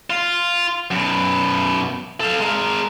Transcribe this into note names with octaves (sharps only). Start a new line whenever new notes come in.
F4
F#2 B2
A4 F5
G#3 A#4